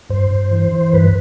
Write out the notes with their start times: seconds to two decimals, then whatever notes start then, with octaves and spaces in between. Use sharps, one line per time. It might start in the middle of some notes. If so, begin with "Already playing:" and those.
0.09 G2 C5
0.31 G2
0.51 E3
0.72 E3
0.93 G2 B4